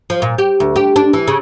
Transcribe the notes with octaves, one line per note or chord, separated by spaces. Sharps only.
F3
A#2
G4
D2
G4
D4
E3
C#3